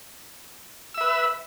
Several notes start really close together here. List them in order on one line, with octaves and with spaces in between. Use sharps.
E6 E5 B4